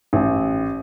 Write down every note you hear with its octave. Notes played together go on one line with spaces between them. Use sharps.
A1